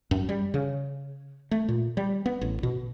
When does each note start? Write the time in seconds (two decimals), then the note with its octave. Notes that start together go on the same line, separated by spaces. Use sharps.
0.11 F#2
0.29 G3
0.54 C#3
1.51 A3
1.68 A#2
1.97 G3
2.26 B3
2.41 A1
2.63 B2